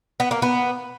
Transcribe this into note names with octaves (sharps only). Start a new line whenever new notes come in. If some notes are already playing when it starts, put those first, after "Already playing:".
B3
A#3
B3